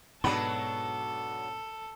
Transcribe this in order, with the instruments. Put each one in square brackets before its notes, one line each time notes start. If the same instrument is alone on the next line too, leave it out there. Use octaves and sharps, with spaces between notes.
[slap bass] G#2 B2 [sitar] F#3 B3 D4 [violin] A4 [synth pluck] B5